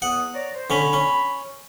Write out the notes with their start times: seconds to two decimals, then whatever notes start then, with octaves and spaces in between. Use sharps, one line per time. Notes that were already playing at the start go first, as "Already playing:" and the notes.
0.02 E2 B3 F#5 D#6
0.34 C#5 D5 A#5
0.54 C5
0.70 D3 C#4 B5
0.93 C#4